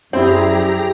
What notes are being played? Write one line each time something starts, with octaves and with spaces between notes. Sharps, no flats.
F#2 G3 C4 E4 G4 G#4 A#5 C6